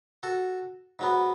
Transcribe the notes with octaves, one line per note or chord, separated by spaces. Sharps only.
F#4 A4
G#2 F#3 B3